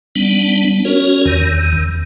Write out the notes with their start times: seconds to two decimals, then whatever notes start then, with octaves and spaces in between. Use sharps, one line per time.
0.15 G3 B3 D4
0.85 C#4 F#4 A#4 C#5
1.25 E2 D#3